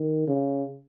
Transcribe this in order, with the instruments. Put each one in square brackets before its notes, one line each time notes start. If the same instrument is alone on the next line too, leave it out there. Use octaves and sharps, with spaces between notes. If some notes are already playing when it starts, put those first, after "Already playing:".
Already playing: [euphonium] D#3
C#3